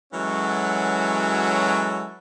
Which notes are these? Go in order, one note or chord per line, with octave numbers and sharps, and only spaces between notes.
E3 F#3 G#3 C#4 F#4 A4